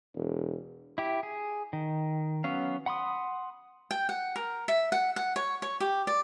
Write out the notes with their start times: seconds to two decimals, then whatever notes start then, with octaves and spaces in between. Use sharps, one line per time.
0.15 E1
0.98 E4 G4
1.23 G#4
1.73 D#3
2.44 F#3 B3 C#4 F5
2.86 F#5 B5 C6 D#6
3.91 G5
4.09 F#5
4.36 A#4
4.68 E5
4.92 F#5
5.16 F#5
5.36 C#5
5.62 C#5
5.80 G4
6.07 D5